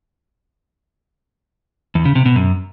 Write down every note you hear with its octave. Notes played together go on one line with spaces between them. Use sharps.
E2
C#3
C3
B2
F#2